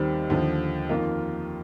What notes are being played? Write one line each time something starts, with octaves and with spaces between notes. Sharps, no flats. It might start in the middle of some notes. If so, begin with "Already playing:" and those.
Already playing: D#2 D#3 G3 C4
D#2 D3 F3
F2 D#3 A#3 F4